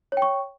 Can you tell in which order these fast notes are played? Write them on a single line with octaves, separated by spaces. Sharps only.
C#5 G5 C#6